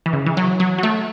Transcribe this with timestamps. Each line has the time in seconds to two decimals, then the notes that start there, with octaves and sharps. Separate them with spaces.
0.06 E3
0.13 C#3
0.26 E3
0.37 F#3
0.60 F#3
0.78 F#3
0.83 A3